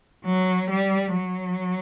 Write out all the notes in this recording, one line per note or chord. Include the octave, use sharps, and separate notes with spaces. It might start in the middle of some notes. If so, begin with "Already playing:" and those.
F#3
G3
F#3